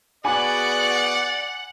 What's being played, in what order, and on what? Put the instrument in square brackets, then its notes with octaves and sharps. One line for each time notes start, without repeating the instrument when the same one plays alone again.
[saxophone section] B3 F#4 G#4 [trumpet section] D5 [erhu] F#5 [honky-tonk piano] G#5 B5 D6